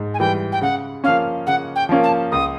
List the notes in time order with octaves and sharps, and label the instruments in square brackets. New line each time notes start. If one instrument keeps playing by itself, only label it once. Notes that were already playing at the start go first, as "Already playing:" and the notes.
Already playing: [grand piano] G#2
[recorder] G#5
[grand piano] E3 G3 [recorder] G5
[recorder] G5
[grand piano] C#3 [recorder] F#5
[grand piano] F3 A#3 C#4 [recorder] F5
[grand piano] C#3 [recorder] F#5
[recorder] G5
[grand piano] F3 A#3 C#4
[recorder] A5
[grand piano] C#2 [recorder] D#6